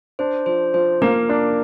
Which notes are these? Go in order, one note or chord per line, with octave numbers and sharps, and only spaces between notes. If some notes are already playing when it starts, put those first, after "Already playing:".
D4 C5
F3 C5
F3 C5
A#3 A#4
D4